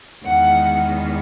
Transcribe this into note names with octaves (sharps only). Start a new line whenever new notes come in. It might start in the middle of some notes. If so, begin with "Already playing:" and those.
E2 D#3 G#3 F#5